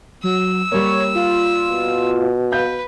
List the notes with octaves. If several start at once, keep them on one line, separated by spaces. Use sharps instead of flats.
F#3 E6
G3 A#3 C#5
F4
B2
B4 F5 G6